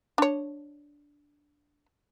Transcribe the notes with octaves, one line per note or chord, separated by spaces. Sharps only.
D4 C#5